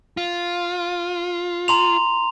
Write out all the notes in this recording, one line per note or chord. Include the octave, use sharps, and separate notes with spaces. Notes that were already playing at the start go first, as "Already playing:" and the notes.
F4
A#5 C6 F7